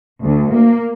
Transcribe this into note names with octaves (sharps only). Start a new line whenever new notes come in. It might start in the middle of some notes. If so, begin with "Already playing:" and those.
D2
A#3